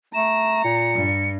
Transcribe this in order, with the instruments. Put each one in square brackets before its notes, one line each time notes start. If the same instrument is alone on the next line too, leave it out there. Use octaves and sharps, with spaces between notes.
[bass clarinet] A3 [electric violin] A#5 [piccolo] E7
[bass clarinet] A#2 [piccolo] C#7
[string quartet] G2